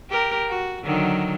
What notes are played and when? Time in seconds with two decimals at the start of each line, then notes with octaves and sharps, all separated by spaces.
0.11 G4 A#4
0.49 F#4
0.84 D3 D#3 F#3